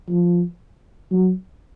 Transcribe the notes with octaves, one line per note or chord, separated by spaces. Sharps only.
F3
F#3